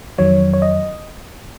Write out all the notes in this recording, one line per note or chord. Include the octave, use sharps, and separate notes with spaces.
F2 D#3 F#3 C#5
C#5
D#5